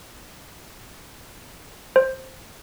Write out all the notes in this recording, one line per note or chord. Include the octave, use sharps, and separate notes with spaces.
C5